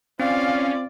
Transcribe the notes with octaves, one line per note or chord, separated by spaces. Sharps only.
C4 C#4 F4 D5 F5